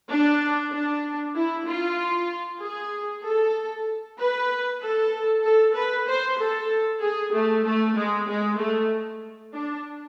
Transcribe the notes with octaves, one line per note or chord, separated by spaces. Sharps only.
D4
D4
E4
F4
G#4
A4
B4
A4
A4
B4
C5
A4
G#4
A3
A3
G#3
G#3
A3
D4